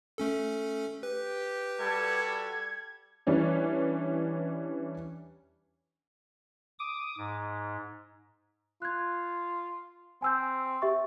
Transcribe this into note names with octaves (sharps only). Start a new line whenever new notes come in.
A3 C#4 A4
G4 B4
G3 F#4 A4 G#6
E3 G3 C#4 D4
D6 D#6
G#2
F4 F#6 G#6
C4 G#5 E6 G6
G4 E5 C#6